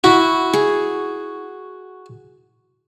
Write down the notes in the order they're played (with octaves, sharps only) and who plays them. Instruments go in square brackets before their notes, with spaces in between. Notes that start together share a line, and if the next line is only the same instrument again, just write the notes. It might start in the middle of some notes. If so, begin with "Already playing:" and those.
[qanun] E4 [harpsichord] F#4
[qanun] G#4